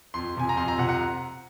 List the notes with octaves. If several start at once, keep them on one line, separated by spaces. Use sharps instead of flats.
F2 C6
C3 F3 G#5
A#5
F2 C6
A#5
C3 F3 F#5
F#5